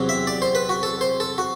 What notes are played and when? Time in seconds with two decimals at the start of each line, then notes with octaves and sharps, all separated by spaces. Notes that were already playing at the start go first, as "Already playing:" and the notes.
Already playing: E2 C3 F#3 C4
0.09 E5
0.27 D5
0.42 C5
0.55 B4
0.69 F#4
0.83 A4
1.01 C5
1.20 A4
1.38 F#4